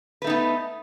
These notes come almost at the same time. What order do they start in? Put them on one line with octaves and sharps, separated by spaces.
B4 A3 D#4 B3